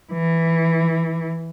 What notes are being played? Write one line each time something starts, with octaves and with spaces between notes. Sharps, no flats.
E3